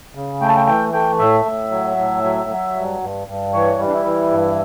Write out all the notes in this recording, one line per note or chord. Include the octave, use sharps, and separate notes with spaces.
C#3
A3 G5
A5
G5
E3 G5
A3 G5
A2 E5
A2
F#3
A2
F#3
F#3
G2
G2
G2
E3 C#5
G3
D4
E4
E3
G2